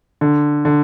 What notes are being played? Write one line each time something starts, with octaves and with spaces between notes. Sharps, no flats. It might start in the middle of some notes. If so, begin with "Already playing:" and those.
D3
D3